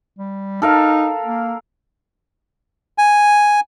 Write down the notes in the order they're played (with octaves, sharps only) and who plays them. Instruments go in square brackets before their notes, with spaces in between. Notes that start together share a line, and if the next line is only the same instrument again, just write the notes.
[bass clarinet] G3
[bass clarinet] D#4 [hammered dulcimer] A4 A#4 F5
[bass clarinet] A#3
[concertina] G#5